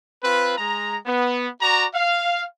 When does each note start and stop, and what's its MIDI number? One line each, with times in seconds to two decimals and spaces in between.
0.23 0.57 60
0.23 0.57 65
0.23 0.57 71
0.57 0.96 56
0.57 0.96 82
1.06 1.48 59
1.61 1.85 66
1.61 1.85 74
1.61 1.85 82
1.94 2.43 77